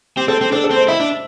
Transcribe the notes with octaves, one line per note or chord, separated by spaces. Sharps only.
C4 G4
C4 A4
C4
D4 A4
A4
C4
C5
E4 E5
D4